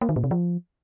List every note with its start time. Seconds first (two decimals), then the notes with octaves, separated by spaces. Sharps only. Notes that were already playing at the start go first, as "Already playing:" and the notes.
0.01 A#3
0.09 D#3
0.16 A#2
0.24 C3
0.31 F3